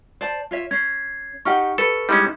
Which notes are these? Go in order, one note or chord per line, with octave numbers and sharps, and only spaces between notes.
C5 D5 A5
F4 C#5 E5
C#4 G#6 C7
D#4 G4 F#5 C#6 F6
A4 B4
G3 G#3 C#4 D#4 E4